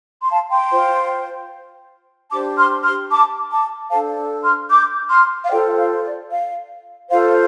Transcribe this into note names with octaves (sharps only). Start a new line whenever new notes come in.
C6
F5 A5
G5 C6
F4 C5
D4 G4 C5 A5 D6
C6 F6
C6 F6
A5 D6
A5 D6
D4 A4 C5 F5 A5
C6 F6
D6 G6
C6 F6
F5
F4 A4 C5 D5 G5
F5
D5
F5
F4 A4 C5 F5